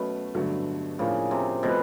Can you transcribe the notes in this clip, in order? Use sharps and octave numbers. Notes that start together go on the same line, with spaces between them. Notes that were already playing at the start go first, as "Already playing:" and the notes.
Already playing: B2 F#3 A3 C#4
G2 D3 F#3 A3
A2 C#3 F3 A#3 D4
C3
B2 F3 A3 C4